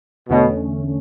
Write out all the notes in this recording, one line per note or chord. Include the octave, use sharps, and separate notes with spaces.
E2 B2 D3 A3 C#4